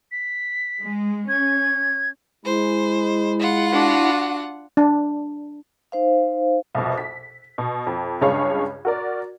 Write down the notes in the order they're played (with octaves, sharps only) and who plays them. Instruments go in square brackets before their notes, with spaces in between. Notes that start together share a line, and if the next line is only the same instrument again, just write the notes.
[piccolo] B6
[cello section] G#3
[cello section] C#4 [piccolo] G#6
[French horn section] G#3 [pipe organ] E4 [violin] C5
[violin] F4 F#5
[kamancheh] D4 F#4
[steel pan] D4
[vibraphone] D#4 C5 F5
[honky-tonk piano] C2 F2 B2
B6
B2
F2
C#2 G2 G#4 C#5 F5 C#6
F#4 A#4 D5